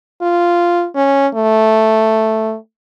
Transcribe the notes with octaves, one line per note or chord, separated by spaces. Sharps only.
F4
C#4
A3